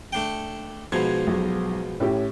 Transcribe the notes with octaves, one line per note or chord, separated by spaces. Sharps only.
A3 D4 G5
G#2 B2 F3 G#6
B1
A2 C#4 G4